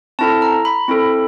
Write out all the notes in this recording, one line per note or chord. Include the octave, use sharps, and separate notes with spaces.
C4 E4 A4 A5
A#5
B5
C4 E4 A4